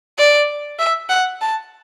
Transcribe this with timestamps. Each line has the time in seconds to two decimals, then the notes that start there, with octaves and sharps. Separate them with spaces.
0.18 D5
0.79 E5
1.09 F#5
1.41 A5